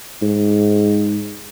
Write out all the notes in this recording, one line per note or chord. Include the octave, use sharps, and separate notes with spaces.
G#2